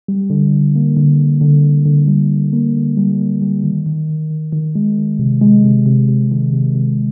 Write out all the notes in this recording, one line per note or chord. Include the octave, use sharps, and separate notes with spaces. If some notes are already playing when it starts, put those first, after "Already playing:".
G3
D3
D3
A#3
D3
D3
D3
D3
D3
G3
D3
A#3
D3
G3
A#3
G3
D#3
D#3
D#3
D#3
D#3
G#3
D#3
C3
G#3
C3
C3
C3
D#3
C3
C3